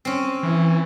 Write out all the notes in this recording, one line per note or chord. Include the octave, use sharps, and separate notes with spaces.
C4 C#4
E3